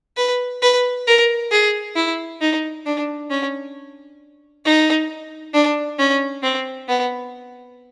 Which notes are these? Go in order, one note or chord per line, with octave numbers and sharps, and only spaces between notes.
B4
B4
A#4
G#4
E4
D#4
D4
C#4
D#4
D4
C#4
C4
B3